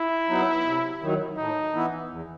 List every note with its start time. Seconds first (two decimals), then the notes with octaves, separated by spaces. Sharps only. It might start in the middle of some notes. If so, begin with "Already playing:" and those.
Already playing: E4
0.29 F#3 B3 D#4
0.65 C3
1.01 D#3 F#3
1.37 A2 D#4
1.74 E3 B3 E4
2.09 E2